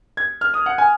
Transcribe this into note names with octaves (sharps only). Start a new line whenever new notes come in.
G#6
F6
D#6
F#5
G#5